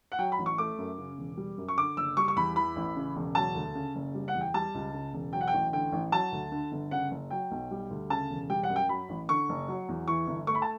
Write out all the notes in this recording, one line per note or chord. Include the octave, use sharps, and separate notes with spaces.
F#5
F#3 G5
B5
A1
C#6
A3 D6
F#2
C#3
E1
G3
F#2
C#6
D3 D6
F#1 E6
G3 C#6
C#6
E2 B5
E3 B5
A1
C#3
E1
F#3 A5
D2
C#3
F#1
G3
F#5
E2
G5
G3 A5
C#2
C#3
E1
F#3 G5
F#5
G5
A1
D3 G5
A1
F#3 A5
D2
D3
G1
C#3 F#5
F#1
F#3 G5
B1
G3
D2
C#3 A5
E1
G3 G5
F#5
F#2
G5
F#3 B5
A1
D3 C#6
F#1
F#3
E2
E3 C#6
G1
A3 C#6
B5
A5